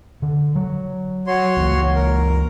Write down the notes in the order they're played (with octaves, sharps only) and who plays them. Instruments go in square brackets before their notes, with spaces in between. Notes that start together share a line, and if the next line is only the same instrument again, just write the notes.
[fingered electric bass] D3
F#3
[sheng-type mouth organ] F#4 C#5 C6
[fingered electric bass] C#2 E3 A#3
[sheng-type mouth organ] A#4